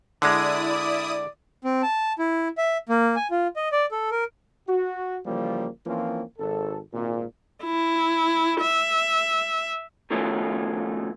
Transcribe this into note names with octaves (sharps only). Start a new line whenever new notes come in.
D3 G#3 E4 D5 D#6
C4
A5
E4
E5
A#3
G#5
F4
D#5
D5
A4
A#4
F#4
C#3 E3 F3 G3 A#3
E3 F3 A#3 C4 C#4 F4
G#1 A4
G#1 A#2
E4
E5
B2 D#3 F3 A3 C#4